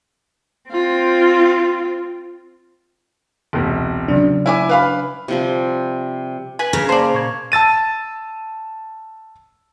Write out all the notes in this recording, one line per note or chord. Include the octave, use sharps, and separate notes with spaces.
C4 F4
E1 C2
C#3 F#3 D4
E4 G#5 D6
B4 F5 B5
C3 F3 G3
B4 G#5
C#3 A#4
A#3 C5 D5 A5
A#2 C#6 G#6
A5 E6 A6 D#7